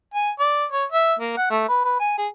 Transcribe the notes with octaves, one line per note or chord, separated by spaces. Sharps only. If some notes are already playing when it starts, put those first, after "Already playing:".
G#5
D5
C#5
E5
A#3
F#5
A3
B4
B4
G#5
G#4